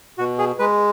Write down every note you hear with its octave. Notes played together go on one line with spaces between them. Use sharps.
B2 F#4
G#4
G#3 B4